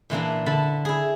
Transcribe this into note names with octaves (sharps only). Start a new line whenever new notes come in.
A#2 E3 A#3 D4
D3 A5 B5
E4 G#4